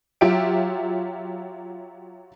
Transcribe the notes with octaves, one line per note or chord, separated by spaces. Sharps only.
F#3 F4 G4 E5 D7